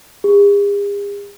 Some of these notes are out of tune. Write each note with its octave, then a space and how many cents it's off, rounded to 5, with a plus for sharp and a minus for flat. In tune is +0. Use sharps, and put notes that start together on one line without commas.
G#4 -45